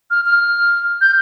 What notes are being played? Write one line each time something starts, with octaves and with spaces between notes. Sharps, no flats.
F6
F6
G6